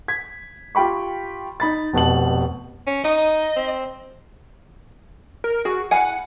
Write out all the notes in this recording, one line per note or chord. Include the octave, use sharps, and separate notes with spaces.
G#6 B6
F4 G4 G5 B5 C#6
D#4 B5 A6
F1 B2 A5 F#7
C#4
D#4 D#5
C4
A#4
F#4 G#4
E4 F5 F#5 G#5